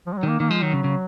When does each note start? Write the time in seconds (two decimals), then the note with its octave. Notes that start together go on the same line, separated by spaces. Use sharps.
0.06 F3
0.13 G#3
0.17 F#3
0.23 D#3
0.28 A#3
0.40 D#3 A#3
0.51 F3 G#3
0.62 D#3 F#3
0.73 C#3
0.84 C#3